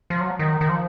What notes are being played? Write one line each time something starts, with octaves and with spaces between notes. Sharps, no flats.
F3
F#3
D#3
D#3
F3